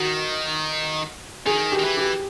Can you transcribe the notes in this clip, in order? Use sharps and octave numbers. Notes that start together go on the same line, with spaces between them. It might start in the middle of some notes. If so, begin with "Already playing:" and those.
Already playing: D#3 F#4
D#3 G#4
G4
D#3
E3
G4